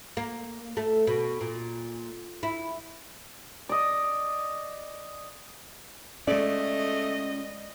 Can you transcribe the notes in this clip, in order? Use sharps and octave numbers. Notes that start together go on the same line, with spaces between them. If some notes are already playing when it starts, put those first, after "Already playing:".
A#3
A3
B2
A#2
E4
D5 D#5
G#3 A3 C#4 D5 D#5